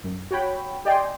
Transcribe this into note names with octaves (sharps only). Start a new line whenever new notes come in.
F#2
F#4 C#5 G5 B5
G4 D5 D#5 G5 G#5 C6